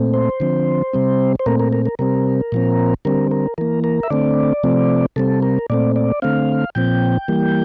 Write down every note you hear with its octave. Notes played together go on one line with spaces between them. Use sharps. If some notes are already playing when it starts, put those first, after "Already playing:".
Already playing: A#2 A3 C4
C5
D3 F3 C4
C3 G3 C4
C5
A#2 A3 C4 A#4
A#4
A#4
A#4
C3 G3 C4 A#4
A#2 F3 C4
D3 G3 C4 A#4
A#4
E3 A#3 A#4
A#4
E5
D3 A3 C4 D5
C3 F3 A3 C4
C3 G3 C4 A4
A#4
A#2 A3 C4 D5
D5
D3 A3 C4 F5
A#2 F3 C4 G5
E3 G3 A#3